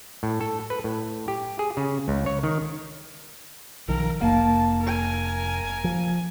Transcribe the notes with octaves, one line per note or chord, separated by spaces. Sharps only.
A2
A4
B4
A2
G4
G#4
C#3
C#2
C#5
D#3
B1 D#3 F3 A#4
F1 A#3 F#5 A5
A#4 G#5
F3